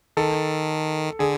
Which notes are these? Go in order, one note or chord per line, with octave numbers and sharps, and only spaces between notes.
D#3 A4
D3 G#4